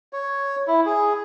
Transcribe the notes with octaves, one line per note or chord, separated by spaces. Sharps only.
C#5
E4
G#4